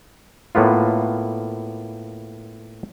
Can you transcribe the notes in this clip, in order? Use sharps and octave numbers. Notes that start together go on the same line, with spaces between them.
A2 A#3 B3 F4